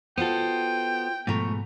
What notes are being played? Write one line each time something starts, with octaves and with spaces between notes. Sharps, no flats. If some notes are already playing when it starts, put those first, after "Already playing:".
B3 F4 F#4 A4 C5 G5
G#2 B2 F3 A3 A#5